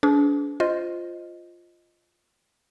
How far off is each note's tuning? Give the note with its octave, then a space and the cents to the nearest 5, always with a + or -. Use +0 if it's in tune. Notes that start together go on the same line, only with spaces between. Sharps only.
D4 -35 G#4 +25 B4 +35
F4 +0 C5 +0 D#5 +0